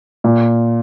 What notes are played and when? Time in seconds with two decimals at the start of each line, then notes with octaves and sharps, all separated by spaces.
0.24 A#2